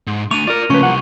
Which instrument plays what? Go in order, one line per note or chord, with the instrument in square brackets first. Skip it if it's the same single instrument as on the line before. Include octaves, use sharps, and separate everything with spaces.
[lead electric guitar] G#2
[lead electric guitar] A3 D4 [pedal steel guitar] C#6 [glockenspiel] D#7 F7
[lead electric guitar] F4 A#5 [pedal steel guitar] A#4 D5
[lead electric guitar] C#3 A3 [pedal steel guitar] F3 A#3 [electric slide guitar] C#4 B4 [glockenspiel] C#6
[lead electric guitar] C2 [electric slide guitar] F#5